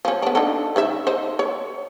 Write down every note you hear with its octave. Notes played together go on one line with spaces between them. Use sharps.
F3 C#4
B3 D4
D4 D#4 A4
C#3 D#4 E5
D#4 C5
C#5